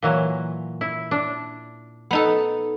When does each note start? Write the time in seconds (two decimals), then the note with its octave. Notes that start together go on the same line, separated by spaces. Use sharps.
0.02 A#2 E3 F#3
0.81 E4
1.11 D4
2.11 B3 D#4 A4